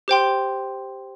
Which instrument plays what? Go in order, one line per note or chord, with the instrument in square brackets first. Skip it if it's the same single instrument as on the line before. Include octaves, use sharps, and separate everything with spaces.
[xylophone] G4 C5 G5 C6